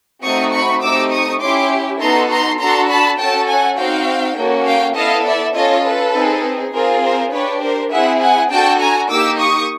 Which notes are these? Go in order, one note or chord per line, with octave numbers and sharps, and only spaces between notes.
A3 C4 D#4 F#4 C#6 D#6
B5 C#6
A3 C4 D#4 G4 D6 E6
C#6 D#6
C#4 E4 G4 C6 D6
B3 D#4 F#4 A4 A#5 C6
A#5 C6
D4 F#4 A4 A#5 C6
A5 B5
C#4 F#4 A4 G5 A5
F#5 G#5
C4 D#4 F#4 F5 G5
A#3 C#4 F#4 A4
F5 G5
B3 E4 A4 D#5 F5
D5 E5
C#4 F4 A4 C#5 D#5
A4 B4
C4 D#4 G#4
C4 F4 G#4 A#4
A#4 C5
D4 G4 B4 C#5
A#4 C5
C4 E4 G#4 E5 F#5
F#5 G#5
D4 F#4 A4 G5 A5
G#5 A#5
A#3 D#4 G4 D6 E6
C#6 D#6